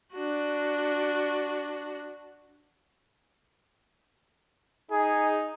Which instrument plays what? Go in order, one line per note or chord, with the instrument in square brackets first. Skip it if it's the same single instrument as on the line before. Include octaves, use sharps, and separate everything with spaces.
[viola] D4 F#4
[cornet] D#4 [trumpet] G#4